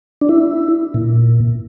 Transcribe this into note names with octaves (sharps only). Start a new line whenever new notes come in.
D4
E4
A#2